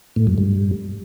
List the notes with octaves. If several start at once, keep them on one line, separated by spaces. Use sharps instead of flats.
A2
F#2
G2